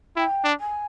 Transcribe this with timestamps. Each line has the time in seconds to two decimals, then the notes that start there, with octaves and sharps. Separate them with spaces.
0.16 E4 G5
0.44 D4
0.60 G#5